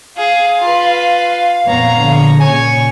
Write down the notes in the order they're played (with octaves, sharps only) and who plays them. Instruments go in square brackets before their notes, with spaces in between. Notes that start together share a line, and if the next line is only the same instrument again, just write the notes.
[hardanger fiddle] G#4 [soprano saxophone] F5
[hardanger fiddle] F4 B4
[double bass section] F2 A#2 B3 [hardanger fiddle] C#5 A#5
[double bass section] A#1 D3
[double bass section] A#2 C#3 [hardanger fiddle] C#5 C#6 [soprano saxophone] G#5